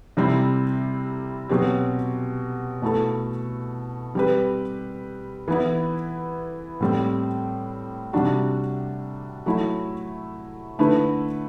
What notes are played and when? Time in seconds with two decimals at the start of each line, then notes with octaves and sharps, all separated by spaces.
0.17 C3 G3 C4 E4
1.49 B2 F#3 C4 G4
2.82 B2 A3 E4 A4
4.15 G3 C4 G4 B4
5.48 E3 B3 E4
6.81 A2 G3 C4
8.13 C3 G3 D4 F#4
9.46 F#3 A3 E4
10.79 D3 A3 E4 B4